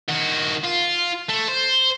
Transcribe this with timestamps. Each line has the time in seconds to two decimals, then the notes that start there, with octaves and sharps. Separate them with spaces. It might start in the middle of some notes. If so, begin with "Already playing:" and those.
0.09 D#3 F#4
0.65 F4
1.30 A3
1.49 C5